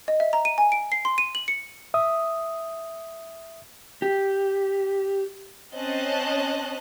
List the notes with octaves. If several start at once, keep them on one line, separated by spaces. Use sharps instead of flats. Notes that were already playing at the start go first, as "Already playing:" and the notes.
D#5
E5
A#5
D#7
G#5
D7
C7
C6
D#7
F#7
C#7
E5 D#6
G4
C4 C#4 D#5 A5 F#6